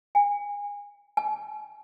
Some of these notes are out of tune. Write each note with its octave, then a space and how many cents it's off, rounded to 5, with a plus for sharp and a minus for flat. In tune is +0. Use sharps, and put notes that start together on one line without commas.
G#5 -25
G#5 +40